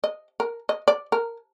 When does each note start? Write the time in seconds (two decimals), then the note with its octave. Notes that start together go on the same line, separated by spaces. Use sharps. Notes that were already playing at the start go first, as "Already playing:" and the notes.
0.04 D#5
0.40 A#4
0.69 D#5
0.88 D5
1.12 A#4